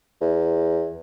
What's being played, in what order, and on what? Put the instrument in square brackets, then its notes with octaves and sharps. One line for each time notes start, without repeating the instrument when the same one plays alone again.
[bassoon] E2